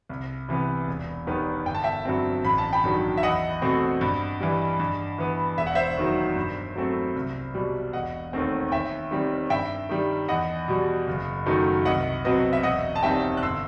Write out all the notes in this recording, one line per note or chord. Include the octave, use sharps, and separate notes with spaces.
C2
C3 E3 B3
E1
D#2 D#3 G3 B3
G1 G5
A5
E5 G5
G2 F#3 C4
A1 B5
A5
G5 B5
G2 D#3 F#3
E5
E2 D#5 F#5
B2 A3 C4
G2
E3 G3
G2
E3 B3
E1 E5
F#5
C5 E5
D#2 D#3 F#3
G2
F#3 A3 C4
C2
B2 G3
E1 D#5 F#5
D#2 D#3 A3 C4
D#2 E5 G5
D#3 G3 C4
G2 E5 G5
D#3 G3
E2 D#5 F#5
B2 G3
F#1
F#2 D#3 F#3 A3
C2 D#5 F#5
B2 F#3 C4 B4 D#5
E5
E1 D#5 F#5
A5
D#2 D#3 G3 C4 E5 G5
F#6
G1 C6 E6